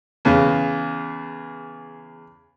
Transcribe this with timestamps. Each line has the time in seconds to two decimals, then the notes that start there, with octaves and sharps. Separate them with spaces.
0.25 E2 C#3